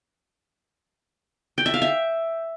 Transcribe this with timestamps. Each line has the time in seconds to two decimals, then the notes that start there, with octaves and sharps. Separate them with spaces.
1.58 G5
1.66 E5
1.74 F5
1.82 E5